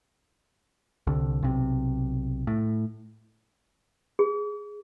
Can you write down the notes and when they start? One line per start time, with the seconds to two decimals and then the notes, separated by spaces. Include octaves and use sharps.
1.07 C2 D3
1.43 B1 C3
2.47 A2
4.19 G#4